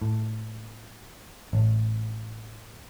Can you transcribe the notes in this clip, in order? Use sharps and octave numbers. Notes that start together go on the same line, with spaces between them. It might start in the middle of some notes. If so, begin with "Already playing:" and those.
A2
A1